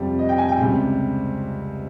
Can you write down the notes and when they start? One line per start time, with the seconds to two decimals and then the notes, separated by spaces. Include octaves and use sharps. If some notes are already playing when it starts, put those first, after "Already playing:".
Already playing: F2 C3 G3
0.19 D#5
0.29 G5
0.38 G#5
0.49 G5
0.58 C#2 C3 G3